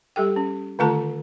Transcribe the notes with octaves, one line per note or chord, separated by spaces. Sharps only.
G3 G4 A4 G5
C#4
D3 D#3 A3 F4 A4 A5